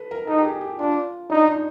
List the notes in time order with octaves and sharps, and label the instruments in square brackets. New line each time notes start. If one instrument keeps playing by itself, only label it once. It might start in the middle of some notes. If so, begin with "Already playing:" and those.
Already playing: [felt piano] A4 B4
A#4
[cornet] D#4 [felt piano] A4
[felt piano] G4
G#4
G4
[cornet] D4 [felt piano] F4
[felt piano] D4 [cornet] D#4
[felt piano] D#4